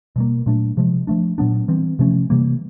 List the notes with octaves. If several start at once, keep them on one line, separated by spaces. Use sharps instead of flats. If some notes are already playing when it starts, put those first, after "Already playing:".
B2 G3 A#3
A#2 F#3 A3 D4
C3 F3 G#3
F3 A3 D4
A#2 F#3 B3 D4
E3 G3 C4
C3 F3 A3 C#4
C3 E3 G3 A#3